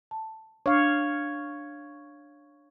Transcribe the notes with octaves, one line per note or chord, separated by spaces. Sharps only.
A5
D4 C#5 F5 D6